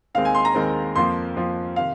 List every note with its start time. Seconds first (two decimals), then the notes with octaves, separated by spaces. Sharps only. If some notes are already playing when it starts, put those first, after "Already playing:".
0.14 D#2 D#3 G#3 C4 F5
0.25 G#5
0.35 C6
0.45 A#5
0.55 D#2 D#3 G#3 C4
0.95 F2 F3 A#3 C6
1.36 F2 F3 A#3
1.76 C3 D#3 F5